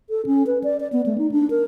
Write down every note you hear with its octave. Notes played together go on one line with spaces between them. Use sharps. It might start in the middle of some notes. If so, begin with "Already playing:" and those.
A4
C#4
B4
D5
D5
B3
A3
D#4
D4
A#4